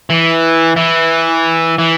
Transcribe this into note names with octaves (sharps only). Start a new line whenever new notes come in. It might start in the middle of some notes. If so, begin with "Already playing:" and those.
E3
E3
E3